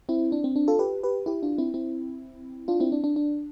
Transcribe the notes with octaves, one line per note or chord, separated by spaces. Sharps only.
C4 E4
D4
C4
D4
F4 A4
G4 B4
G4 B4
E4 G4
D4 F4
C4 E4
C4 E4
D4 F4
C4 E4
D4
D4
D4